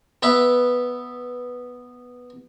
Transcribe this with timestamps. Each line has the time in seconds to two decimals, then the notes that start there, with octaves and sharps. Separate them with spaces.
0.23 B3 B4 E5